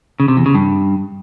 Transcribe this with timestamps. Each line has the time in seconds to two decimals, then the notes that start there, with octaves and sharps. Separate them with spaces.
0.20 C#3
0.28 C3
0.37 E2
0.46 C#3
0.55 G2